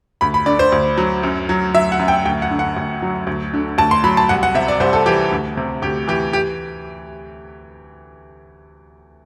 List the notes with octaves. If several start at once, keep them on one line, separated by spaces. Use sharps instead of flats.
D2 B5
B5
D3 D5
C5
D2
F#3
F#2
F#3
F#3 E5
F#5
F#2
G5
D2 G5
F#5
D3
F#5
D2
F#3
D2
D3
D2 A5
C6
F#3 B5
A5
C2 F#5
F#5
C3 E5
D5
C2 C5
A4
E3 G4
D2
C3
D2 G4
E3 G4
G4